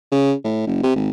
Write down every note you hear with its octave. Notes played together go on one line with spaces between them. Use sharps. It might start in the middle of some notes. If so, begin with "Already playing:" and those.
C#3
A2
F#1
C3
G#1